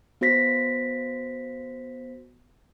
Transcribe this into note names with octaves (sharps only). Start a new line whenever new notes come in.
B3 F#4 C5 A#6 B6